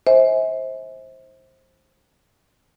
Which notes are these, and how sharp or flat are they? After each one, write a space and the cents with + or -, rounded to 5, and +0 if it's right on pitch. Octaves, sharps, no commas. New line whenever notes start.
C5 +15 E5 -40 G#5 +0